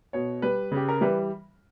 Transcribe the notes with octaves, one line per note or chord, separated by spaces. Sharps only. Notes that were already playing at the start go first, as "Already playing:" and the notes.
B2 C#5
G3 B4
C#3 G4
A#4
E3 G3 B4